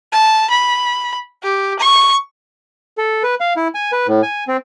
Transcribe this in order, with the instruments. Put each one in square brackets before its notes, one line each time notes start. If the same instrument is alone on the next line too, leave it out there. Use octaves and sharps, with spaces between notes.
[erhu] A5
B5
G4
C#6
[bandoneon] A4
B4
F5
E4
G#5
B4
A2
G#5
C4